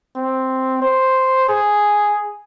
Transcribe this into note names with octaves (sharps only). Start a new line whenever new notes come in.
C4
C5
G#4